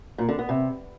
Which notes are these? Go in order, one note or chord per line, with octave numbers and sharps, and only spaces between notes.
A#2
D3
B3
C3